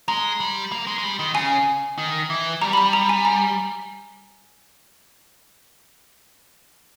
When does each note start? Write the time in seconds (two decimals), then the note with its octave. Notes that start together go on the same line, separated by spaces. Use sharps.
0.08 G#3 A#5
0.40 G3
0.72 A#3
0.87 G#3
0.98 G#3
1.04 G3
1.19 D#3
1.34 C#3 G#5
1.98 D#3
2.30 E3
2.62 G3 A#5
2.73 B5
2.77 A#5
2.93 A#5
3.09 G#5
3.25 A#5